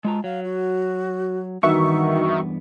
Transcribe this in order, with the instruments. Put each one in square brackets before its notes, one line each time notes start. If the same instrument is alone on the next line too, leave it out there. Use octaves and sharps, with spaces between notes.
[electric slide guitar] G#3 F4 A#5 [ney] A5
[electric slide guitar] F#3 [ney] F5
[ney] F#4
[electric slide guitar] E2 G2 B3 [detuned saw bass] D#3 [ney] D#4 [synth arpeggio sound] F#4 E5 C#6